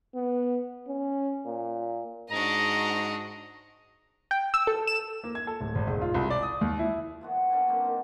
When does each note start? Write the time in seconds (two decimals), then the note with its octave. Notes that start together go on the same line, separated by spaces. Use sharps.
0.15 B3
0.88 C#4
1.46 A#2
2.31 G#2 D4 F#4 D#5 A#5
4.31 G5
4.54 E6
4.67 A4
4.87 E7
5.24 A#3
5.35 G#6
5.47 A4
5.60 D1
5.75 G#1
5.87 E1
6.01 F4
6.14 C2
6.30 D5
6.43 D#6
6.61 D#2
6.79 E4
7.21 F3 B3 F#4
7.50 C#4 D4 F#4 G#5
7.67 F#3 A#3 C4
7.85 D#3